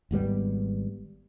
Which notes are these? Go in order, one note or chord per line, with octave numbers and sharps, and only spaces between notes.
G#1 G#2 G3 B3